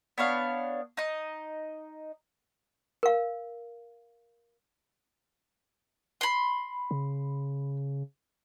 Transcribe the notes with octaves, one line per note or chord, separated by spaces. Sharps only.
B3 D4 C#5 F5
D#4 D#5
A#4 F5
B5 C6
C#3